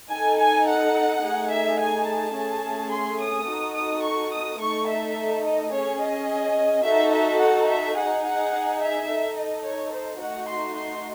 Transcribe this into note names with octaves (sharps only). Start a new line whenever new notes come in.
D#4 A4 G#5
G#5
F#5
A3 D#4 G#4
E5
G#5
A5
A3 C#4 G#4
C6
D#6
D#4 F#4 A4
D#6
C#6
D#6
A3 D#4 A4 C#6
E5
D#5
C#4 G#4 C#5
D#5
D#4 F#4 A4 E5
E5
F#5
E5
D#4 G#4 F#5
F#5
E5
D#4 A4
D#5
C#5
C5
A3 D#4 F#4 F#5
C6
C6